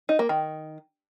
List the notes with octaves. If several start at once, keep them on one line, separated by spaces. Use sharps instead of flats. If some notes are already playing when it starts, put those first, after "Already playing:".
D#4
A#3
D#3